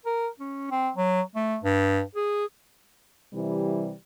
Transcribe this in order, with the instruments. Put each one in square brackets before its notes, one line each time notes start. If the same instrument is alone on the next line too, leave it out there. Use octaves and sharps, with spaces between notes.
[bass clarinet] A#4
C#4
C4
F#3
A3
G2
G#4
[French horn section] C3 E3 G3